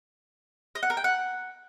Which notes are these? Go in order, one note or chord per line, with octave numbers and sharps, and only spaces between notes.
D#5
F#5
A#4
G5
F#5